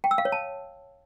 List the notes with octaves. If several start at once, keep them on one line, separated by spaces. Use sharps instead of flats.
G5
E6
F5
C#5
A5